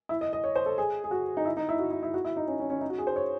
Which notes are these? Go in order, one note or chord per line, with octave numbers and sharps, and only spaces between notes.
E4
D#5
D#5
C#5
C5
A4
G#4
G#4
F#4
D#4
E4
D#4
E4
F#4
E4
E4
F#4
E4
D#4
C#4
C#4
C#4
D#4
F#4
G#4
C5
C#5